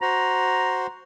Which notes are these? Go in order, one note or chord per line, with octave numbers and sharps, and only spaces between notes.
F#4 C5 A#5